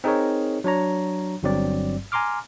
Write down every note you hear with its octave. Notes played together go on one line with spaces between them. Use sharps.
C4 D#4 G#4 A#4 C#5
F#3 D4 C#5 A#5
G1 G2 F#3 C4 D5
G#5 A#5 C6 D6 F6